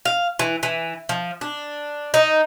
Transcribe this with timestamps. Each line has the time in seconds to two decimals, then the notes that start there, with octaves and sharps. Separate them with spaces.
0.05 F5
0.39 E3
0.63 E3
1.09 F3
1.41 D4
2.14 D#4